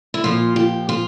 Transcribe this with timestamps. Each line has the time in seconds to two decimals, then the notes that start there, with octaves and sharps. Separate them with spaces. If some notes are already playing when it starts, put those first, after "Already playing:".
0.14 E4
0.24 A#2 F3 F4
0.56 G4
0.89 F4